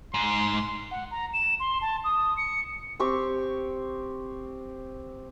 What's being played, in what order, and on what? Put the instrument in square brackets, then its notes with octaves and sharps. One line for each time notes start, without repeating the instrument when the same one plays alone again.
[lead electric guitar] G#2 [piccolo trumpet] C6
[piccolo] F#5
A#5
E7
C6
A5
D#6
C#7
[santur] C4 G4 C#6